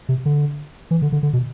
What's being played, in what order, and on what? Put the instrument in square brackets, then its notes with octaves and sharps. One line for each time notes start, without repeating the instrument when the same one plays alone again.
[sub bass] C3
D3
E3
D3
D3
D3
B2